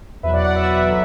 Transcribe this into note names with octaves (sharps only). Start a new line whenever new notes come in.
E2 B2 F#3 B4 E5
D5 F#5
D5 F#5
B4 E5
D3 F#3